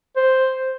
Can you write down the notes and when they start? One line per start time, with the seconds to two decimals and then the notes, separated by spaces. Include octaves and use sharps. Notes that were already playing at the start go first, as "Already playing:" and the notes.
0.16 C5